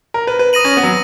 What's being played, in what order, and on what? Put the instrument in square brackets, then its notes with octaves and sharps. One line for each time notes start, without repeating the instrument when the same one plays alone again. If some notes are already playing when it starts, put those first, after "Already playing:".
[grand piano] A#4
B4
B4
[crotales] D#6 A#6 D#7 F#7
[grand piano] C#4
B3
F#3